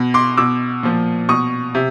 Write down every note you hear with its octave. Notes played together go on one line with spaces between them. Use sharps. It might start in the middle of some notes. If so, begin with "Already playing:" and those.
Already playing: B2
C6 D6
B2 D6 E6
A#2 F3
B2 C#6 D#6
C3